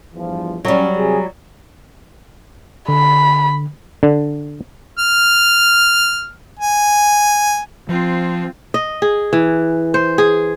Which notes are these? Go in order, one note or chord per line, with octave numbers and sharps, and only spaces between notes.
E2 G2 F3
F#3 G3 C#4
C3 F#4 G#4
D3 B5
D3
F6
G#5
F3 C4 F4
D#5
G#4
E3
C5
G#4